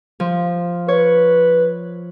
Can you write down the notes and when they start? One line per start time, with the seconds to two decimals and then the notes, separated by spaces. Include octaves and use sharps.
0.20 F3
0.88 B4 C#5